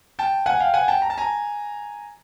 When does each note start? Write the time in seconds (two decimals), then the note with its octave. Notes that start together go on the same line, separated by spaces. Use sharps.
0.19 G5 A5
0.46 F#5 G#5
0.60 F5 G5
0.74 F#5 G#5
0.88 G5 A5
1.02 A#5
1.10 A5
1.17 G#5 A#5